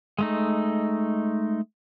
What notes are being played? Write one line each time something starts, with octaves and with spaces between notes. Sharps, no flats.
G#3 A3 D#4